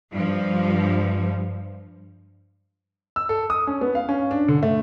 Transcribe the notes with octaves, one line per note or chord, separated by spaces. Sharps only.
G2 F3
E6
A4
D#6
C#4
B3
F5
C#4
D4
D3
A3